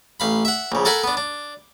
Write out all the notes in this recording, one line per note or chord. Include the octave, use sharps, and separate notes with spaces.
A1 F5 B5
E5 F#5
A#1 C#3
A4 A#4 F#5 G#5 B5
B3 D4
D4